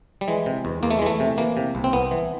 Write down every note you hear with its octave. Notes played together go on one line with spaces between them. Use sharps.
G3
E3 G#3
C3
E2
E2 A#3
A3
G#3
E3 A3
C3
E3 A#3
C3
C2
C4
C2 B3
E3